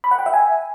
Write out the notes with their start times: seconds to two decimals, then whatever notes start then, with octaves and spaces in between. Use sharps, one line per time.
0.04 B5
0.11 F#5
0.19 G5
0.26 E5
0.34 G#5